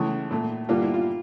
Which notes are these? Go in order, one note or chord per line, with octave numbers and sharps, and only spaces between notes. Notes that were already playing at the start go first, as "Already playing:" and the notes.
Already playing: C#2 C#3 E3 A3 E4
A#2 A3
G2 D3 G3 A#3 F4
E4
F4